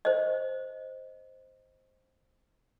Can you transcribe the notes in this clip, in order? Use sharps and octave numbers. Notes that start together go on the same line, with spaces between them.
C5 D#5